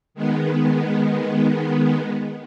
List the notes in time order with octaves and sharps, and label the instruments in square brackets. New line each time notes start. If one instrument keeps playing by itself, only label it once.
[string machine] D#3 G#3 B3